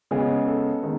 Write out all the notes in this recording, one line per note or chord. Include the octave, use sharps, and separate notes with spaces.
C#3 G#3 B3 G#4
A4
D#3 G#3 B3